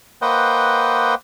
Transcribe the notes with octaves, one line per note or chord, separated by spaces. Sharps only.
A#3 B4 C5 D#5 F#5 G5